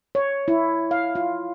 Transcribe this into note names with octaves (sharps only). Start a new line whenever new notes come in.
C#5
E4
F5
F4